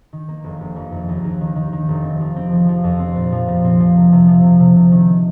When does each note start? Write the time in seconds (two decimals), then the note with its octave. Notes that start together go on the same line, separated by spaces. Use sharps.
0.13 D#3
0.28 A#3
0.44 F1
0.61 F1
0.76 F2
0.92 F1
1.09 D#2
1.24 D#2
1.41 D#3
1.56 D#3
1.73 D#3
1.89 F1
2.04 C4
2.20 F3
2.36 C4
2.52 F3
2.69 F3
2.84 F2
2.99 C4
3.16 A#2
3.32 F3
3.48 A#2
3.65 C4
3.80 F3
3.96 C3
4.12 C3
4.28 F3
4.44 C3
4.60 C3
4.77 C3
4.92 D#3